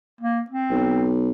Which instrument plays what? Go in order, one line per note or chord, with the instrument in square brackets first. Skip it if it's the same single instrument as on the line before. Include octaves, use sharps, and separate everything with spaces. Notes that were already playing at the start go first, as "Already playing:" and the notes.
[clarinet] A#3
C4
[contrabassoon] B1